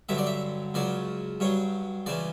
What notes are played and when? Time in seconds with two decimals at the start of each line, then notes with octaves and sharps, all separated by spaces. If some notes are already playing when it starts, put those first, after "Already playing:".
0.09 G2 D3 F#3 E5
0.18 D5
0.26 E5
0.74 C#2 C#3 F#3 D5
1.40 G2 F#3 C#5
2.06 C#2 C#3 E3 D5